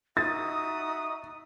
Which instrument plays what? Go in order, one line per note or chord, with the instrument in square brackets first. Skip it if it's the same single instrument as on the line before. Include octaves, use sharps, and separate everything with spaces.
[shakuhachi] D#4 [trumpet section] F#4 E5 D#6 [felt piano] A6